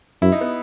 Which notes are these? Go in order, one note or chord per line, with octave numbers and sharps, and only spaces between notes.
F#2 E4
D#4
B3